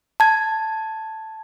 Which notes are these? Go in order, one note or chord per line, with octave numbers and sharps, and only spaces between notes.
A5 G#6